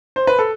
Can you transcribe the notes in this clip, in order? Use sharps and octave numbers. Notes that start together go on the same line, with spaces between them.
C5
B4
A4